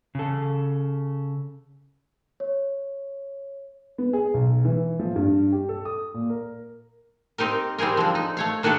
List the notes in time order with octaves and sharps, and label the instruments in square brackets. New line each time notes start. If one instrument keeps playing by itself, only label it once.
[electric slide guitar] C#3 A4
[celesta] C#5
[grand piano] B3
G#4
B1
E3
F3
G2
G4
A4
D#6
A#2
A#4
[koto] C4 D#4 G4 A#4
G3 C4 D#4 G#4 A#4
D3 F3
D#4
A3 C#5 F5
D#3 D4 F#4 G4 A4